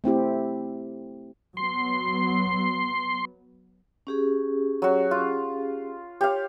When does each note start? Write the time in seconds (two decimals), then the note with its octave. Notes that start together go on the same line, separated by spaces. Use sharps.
0.04 A3 C4 E4 G4
1.57 F#3 B3 C6
4.07 C#4 G4 G#4
4.82 F#3 F#4
5.11 F4
6.21 G4 C#5 F5